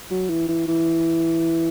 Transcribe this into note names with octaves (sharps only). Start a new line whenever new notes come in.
F#3
E3
E3
E3